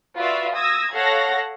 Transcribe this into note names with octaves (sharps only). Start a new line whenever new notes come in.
F4 F#4 B4 D5 E5 F5
D#6 E6 G#6 A#6
A4 C#5 F5 F#5 A#6